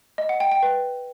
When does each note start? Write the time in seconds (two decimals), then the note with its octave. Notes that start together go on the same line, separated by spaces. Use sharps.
0.18 D#5
0.29 F#5
0.40 G5
0.51 G5
0.63 B4